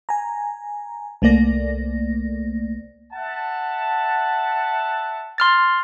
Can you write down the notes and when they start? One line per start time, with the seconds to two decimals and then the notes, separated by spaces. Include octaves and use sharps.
0.09 G#5 A#5
1.22 C2 A3 A#3 D5 A#6
3.13 E5 F#5 A5
5.38 C6 F6 A6